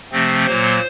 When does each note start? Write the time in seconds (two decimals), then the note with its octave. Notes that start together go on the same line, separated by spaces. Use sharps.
0.12 C3 F3 A3 C4
0.46 A#2 F#3 A#3 C5